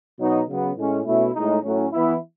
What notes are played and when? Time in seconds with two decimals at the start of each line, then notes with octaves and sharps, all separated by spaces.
0.18 B2 F#3 B3 D#4
0.48 C#3 F#3 B3
0.76 A2 G#3 C#4
1.06 B2 A3 C#4 E4
1.34 A2 G#3 D#4
1.63 A2 F#3 C#4
1.92 E3 B3 E4